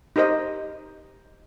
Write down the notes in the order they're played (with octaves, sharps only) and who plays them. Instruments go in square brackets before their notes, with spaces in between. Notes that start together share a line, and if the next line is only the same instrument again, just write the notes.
[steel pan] D#4 G4 A#4 C5 D#5